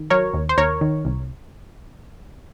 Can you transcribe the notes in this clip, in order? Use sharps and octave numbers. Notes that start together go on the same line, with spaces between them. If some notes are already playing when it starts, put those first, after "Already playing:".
Already playing: D#3
F#3 A#4 C#5
D#2
C5
D#2 A#4 C#5
D#3
C2